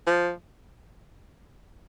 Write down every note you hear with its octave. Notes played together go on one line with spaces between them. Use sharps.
F3